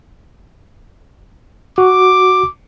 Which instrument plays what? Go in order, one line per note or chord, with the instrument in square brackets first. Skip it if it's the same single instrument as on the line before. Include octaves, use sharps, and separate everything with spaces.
[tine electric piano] F#4 [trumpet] D6